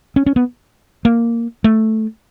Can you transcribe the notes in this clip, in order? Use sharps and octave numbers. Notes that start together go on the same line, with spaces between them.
C#4
C#4
B3
A#3
A3